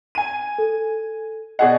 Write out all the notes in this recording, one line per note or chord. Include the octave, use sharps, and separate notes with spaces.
G#5 D#7
A4
B2 G#4 D5 D#5 F#5